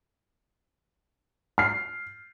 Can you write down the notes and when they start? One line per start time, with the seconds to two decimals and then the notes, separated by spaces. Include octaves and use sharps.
1.58 F6 C7